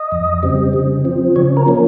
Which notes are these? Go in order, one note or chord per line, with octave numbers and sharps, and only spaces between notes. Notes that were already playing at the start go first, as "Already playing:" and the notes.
Already playing: D#5
F2
C#3 G3 C4
C#3
F3 C4
C#3 C#5
A#4
F3 A#3 C#4